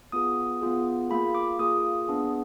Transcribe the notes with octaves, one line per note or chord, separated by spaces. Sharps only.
B3 F4 G#4 D#6
B3 F4 G#4
A#3 F4 G#4 B5
D6
A#3 F4 G#4 D#6
B3 D4 G#4